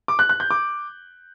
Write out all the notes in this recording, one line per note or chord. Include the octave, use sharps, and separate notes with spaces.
D6
F#6
F#6
G6
D6